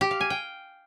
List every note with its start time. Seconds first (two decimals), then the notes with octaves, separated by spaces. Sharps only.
0.01 G4
0.11 F5
0.21 G#5
0.30 G5